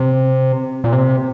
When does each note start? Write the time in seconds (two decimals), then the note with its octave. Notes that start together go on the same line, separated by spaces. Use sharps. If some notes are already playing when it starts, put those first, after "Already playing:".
Already playing: C3
0.84 A#2
0.93 C3